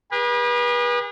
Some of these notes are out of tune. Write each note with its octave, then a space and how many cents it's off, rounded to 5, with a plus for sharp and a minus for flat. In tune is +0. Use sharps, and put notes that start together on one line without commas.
G#4 -45 B4 -35